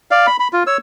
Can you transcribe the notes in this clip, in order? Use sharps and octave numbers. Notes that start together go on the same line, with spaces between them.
D5 F5
B5
B5
F4
C#5 E6